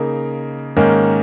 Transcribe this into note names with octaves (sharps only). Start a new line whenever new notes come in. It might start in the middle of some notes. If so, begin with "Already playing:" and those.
Already playing: C#3 A#3 D#4 A#4
G#2 D#3 A#3 C#4